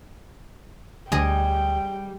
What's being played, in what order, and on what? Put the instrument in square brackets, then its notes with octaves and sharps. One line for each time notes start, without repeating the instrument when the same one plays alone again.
[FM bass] D2 [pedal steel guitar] G3 [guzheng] G#4 D#5 [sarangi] G5